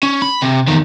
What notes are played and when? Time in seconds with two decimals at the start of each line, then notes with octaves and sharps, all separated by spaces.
0.03 C#4
0.22 B5
0.42 C3
0.67 E2 D#3